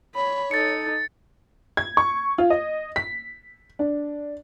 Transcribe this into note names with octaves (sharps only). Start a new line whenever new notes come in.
C#5 B5
D#4 A4 A6 C#7
G#6
C#6
F4
D#5
B6
D4